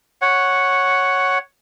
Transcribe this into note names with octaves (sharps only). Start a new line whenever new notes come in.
C#5 F#5